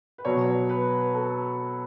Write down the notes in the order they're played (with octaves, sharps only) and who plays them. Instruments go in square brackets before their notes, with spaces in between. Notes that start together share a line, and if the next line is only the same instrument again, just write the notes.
[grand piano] B4
B2 F#3 C#5
B4
A4